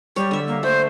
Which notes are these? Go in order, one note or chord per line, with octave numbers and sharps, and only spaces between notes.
G3 C#5
D3 E5
A#3
A3 C5